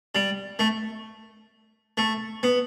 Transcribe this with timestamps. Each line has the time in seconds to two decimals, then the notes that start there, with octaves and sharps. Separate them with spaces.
0.15 G3
0.59 A3
1.97 A3
2.43 B3